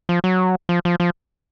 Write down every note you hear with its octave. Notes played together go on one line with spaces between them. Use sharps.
F3
F#3
F3
F3
F3